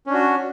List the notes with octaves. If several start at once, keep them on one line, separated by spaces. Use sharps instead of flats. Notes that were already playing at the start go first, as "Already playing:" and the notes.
C#4 D4 F#4